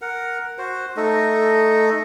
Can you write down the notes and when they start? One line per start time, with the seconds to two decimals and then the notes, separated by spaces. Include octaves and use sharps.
0.02 A#4 F#5
0.58 F#4 C5
0.97 A3 D#4 A4 D#5